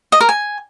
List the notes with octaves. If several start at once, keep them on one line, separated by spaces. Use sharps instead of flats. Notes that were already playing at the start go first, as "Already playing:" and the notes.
D#5
A#4
G#5